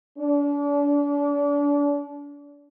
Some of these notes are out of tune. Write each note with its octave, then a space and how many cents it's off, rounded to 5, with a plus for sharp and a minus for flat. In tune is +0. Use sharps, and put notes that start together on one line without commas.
D4 -35